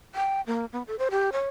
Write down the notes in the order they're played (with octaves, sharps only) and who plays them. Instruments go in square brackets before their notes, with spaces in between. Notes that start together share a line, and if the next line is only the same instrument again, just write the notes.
[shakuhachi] G5
A#3
B3
A4
C5
G4
C#5